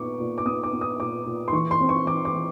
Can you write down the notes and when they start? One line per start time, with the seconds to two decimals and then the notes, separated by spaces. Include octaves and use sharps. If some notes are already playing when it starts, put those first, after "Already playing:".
Already playing: A#2 B3 C#6 D6
0.20 A#2
0.38 D6
0.46 B3 D#6
0.63 D6
0.72 B3
0.81 D#6
1.00 A#2 D6
1.26 A#2
1.48 C6
1.52 E3 C#6
1.71 C6
1.80 C4
1.89 C#6
2.06 E3 D6
2.25 D6
2.33 E3